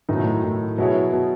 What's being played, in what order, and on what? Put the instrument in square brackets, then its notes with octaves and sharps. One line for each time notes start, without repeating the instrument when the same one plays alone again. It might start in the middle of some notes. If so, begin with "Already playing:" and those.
[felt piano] A2 [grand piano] D#3 F#3 A3 D#4
[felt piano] B2
A2
A2
[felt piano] B2 [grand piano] F#3 B3 E4 G#4 C#5
[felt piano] B2